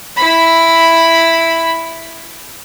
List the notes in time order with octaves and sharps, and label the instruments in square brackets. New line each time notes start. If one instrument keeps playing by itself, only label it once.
[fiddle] E4 B5